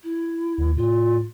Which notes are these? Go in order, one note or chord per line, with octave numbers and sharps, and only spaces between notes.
E4
D#2
A2 F4